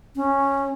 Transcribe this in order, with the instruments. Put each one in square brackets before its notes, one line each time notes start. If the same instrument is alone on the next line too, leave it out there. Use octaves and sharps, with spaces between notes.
[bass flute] C#4